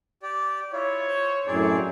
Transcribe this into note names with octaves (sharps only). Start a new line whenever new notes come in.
G4 D5
E4 F4 C#5
C5
F#2 A2 C4 D#4 G#4 D5 C#6